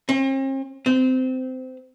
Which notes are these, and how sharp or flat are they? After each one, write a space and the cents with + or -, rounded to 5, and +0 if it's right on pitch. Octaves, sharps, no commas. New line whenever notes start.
C4 +45
C4 -20